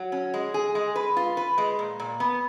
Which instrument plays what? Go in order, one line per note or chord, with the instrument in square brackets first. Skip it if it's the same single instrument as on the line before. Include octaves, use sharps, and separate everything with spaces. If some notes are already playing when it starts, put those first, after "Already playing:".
Already playing: [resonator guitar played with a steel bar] F#3
C#4
G#3
G#4
G#3
B4
F4
B4
G#3
A#2
A#2
B3